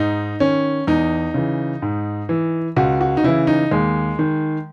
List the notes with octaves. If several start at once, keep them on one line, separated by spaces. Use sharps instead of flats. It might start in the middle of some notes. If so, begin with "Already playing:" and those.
Already playing: G#2 D#4
D#3 C#4
E2 D#4
C#3 E3
G#2
E3
C#2 F#4
F#4
D#4
C#3 E3 E4
D#4
D#2 G#3
D#3